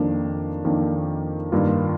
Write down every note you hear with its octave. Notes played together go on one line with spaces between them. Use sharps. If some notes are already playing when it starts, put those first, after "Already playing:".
Already playing: F2 D#3 A#3 D4
F2 D#3 A#3 D4
G2 D#3 A#3 F4